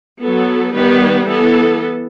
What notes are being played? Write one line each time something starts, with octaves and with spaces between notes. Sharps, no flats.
F#3 B3 A4
D#3 G3 B3 B4
E3 B3 A4